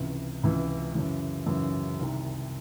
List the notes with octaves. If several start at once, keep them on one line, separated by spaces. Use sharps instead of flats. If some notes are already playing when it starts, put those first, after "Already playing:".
Already playing: C#2 C3 E3
C#2 C3 E3
F#2 C#3 E3
F#2 C#3 E3
C2 C3 D#3